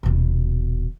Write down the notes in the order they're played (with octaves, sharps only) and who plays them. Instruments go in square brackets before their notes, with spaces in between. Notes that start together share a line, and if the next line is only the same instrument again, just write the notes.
[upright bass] D#1 B2